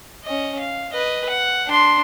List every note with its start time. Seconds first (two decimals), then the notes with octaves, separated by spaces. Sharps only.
0.24 C#4 D#5
0.59 F5
0.93 B4 D#5
1.29 F#5
1.67 D4 C6